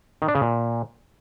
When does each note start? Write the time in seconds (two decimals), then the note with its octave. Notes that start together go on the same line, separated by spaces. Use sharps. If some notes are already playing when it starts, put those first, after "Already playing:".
0.22 D#3
0.28 D4
0.35 C#3
0.41 A#2